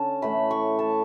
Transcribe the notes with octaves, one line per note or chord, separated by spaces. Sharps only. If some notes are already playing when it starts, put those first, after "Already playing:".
Already playing: D3 C#4 A5
A2 E3 A3 B5
C#6
A5